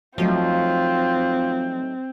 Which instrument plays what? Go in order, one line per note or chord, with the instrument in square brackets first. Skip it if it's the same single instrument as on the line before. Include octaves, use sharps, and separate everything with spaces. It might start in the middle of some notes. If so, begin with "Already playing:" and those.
[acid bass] F3 [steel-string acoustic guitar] F#3 A3 D#4 [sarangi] C4 [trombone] F4